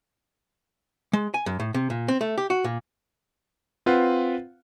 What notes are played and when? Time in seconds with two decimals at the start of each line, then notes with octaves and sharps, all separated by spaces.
1.13 G#3
1.34 G#5
1.46 F#2
1.60 A2
1.74 C3
1.90 A#2
2.08 C4
2.21 A3
2.38 G4
2.50 F#4
2.64 A#2
3.86 C4 F4 B4 F5 F#5